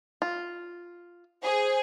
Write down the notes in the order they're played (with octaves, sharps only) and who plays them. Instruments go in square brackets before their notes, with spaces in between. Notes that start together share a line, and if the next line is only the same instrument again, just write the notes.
[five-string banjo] F4
[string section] G#4 [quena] C5